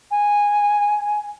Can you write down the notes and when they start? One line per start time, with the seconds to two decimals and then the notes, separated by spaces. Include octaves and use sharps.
0.11 G#5